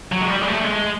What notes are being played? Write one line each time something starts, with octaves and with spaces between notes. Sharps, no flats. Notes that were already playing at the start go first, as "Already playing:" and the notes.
F#3
G#3
G3
G#3
A3
G#3